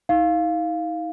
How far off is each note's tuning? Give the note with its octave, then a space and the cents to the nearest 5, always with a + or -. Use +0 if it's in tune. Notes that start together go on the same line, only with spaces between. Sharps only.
D#4 +40 F5 +0